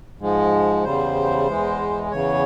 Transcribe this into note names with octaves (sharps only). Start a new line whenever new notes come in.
G#2 F3 G#3
E2 C#3 G3 C5
E2 E3 G#3
E2 C#3 E3 C#5